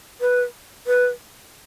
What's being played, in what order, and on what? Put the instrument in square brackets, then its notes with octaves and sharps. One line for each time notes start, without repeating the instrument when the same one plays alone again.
[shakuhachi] B4
B4